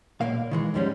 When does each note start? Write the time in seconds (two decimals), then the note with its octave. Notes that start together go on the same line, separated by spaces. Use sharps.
0.21 B1 A#2 A#3 F5
0.51 D#3 E3 G#3
0.74 D#2 G#2 F3 G3 G#3 C#4